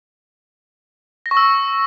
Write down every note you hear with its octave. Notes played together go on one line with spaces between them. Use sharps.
A#6
C#6
E6